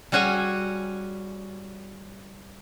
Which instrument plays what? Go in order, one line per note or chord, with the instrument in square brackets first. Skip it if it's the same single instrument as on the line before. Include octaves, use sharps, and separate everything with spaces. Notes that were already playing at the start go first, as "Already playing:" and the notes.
[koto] G3 C#4 F#4 G#4 G#5